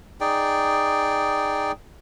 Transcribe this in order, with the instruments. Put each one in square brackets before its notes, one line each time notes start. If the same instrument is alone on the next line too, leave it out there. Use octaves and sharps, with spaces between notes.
[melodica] D#4 G#4 D5 G5